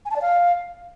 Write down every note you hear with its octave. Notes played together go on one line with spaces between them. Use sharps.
G#5
A5
D5
F5